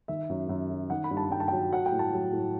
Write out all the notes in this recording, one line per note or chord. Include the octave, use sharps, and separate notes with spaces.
D#3 E5
F#2
F#2
F#3
D#3 F#5
B5
G2
A5
G2 G5
A5
F#3 G5
F#3 F#5
G5
A2
A5
F#3
A2